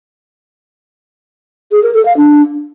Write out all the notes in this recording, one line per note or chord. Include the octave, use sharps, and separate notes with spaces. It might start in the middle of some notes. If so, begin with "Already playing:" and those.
G#4
A#4
A4
F5
D4